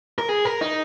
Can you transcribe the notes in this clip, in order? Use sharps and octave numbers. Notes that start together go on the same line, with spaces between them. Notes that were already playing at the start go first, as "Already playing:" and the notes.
A#4
G#4
A#4
D#4